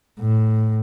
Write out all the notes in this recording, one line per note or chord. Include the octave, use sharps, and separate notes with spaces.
A2